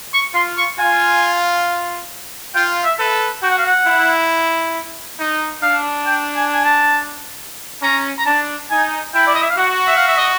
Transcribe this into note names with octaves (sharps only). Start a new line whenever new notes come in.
C#6
F4 C6
C#6
F4 G#5
F4 G5
E5
A4 B4
F#4 G5
F#5
F5
F#5
E4
D#4
D4 F5
G5
G#5
G#5
A5
C#4 A#5
A#5
D4 A5
D#4 G#5
E4 G5
D5
D#5
E5
F5
F#4 F#5
E5
F5
E5
D#5